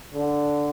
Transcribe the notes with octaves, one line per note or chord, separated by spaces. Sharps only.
D3